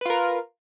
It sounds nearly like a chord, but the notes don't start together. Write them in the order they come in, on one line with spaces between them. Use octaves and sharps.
B4 F4 A#4